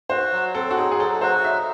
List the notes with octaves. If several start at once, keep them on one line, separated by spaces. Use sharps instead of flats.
F#4 C5
F#3
C4 A4
F#4
D#4 G#4
G#4
F#3 A4
F#4 C5
D#4 E5